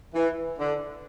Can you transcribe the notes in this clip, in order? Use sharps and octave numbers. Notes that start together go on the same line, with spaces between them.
E3
D3